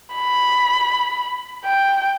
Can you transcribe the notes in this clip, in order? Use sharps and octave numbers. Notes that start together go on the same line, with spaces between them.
B5
G5